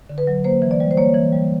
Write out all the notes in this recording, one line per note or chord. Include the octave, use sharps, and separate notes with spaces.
D3
B4
F#3
A#3 C5
E3
D5
G3
C5
A#3 C#5
E3
G3